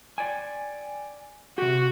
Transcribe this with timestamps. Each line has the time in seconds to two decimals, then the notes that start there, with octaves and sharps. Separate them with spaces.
0.18 D5 G5 G#5
1.58 C3 F#4 G4